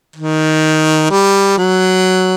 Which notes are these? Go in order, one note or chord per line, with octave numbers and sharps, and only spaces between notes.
D#3
G3
F#3